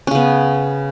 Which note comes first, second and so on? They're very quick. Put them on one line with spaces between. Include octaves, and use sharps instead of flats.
C#4 C#3 B3